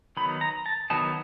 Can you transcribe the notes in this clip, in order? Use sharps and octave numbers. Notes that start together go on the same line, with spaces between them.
D#3 F#3 B3 D#4 B5
A#5
A5
D#3 F#3 B3 D#4 A5